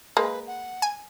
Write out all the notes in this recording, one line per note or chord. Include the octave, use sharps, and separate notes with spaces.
G#3 A#3 B4
F#5
G#5